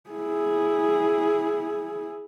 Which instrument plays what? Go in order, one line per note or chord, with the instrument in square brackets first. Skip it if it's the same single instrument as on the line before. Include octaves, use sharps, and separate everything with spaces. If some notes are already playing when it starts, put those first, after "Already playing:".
[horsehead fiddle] E4 G#4